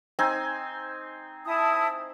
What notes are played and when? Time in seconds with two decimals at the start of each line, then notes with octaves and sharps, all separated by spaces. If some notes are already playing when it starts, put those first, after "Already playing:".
0.19 C4 D#4 G#5
1.45 E4 A5 D#6